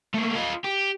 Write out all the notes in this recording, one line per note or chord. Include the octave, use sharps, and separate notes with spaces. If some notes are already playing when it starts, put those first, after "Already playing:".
A3 A#3
F4 D#5
G4